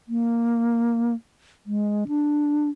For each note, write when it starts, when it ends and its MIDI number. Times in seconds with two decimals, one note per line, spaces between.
0.08 1.14 58
1.66 2.04 56
2.08 2.69 62